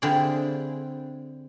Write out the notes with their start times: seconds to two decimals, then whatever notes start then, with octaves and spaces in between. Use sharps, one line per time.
0.02 D3 C4 E4 F4 G4 G#4